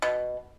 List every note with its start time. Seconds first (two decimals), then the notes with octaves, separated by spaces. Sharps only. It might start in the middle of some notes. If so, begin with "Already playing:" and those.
0.02 B2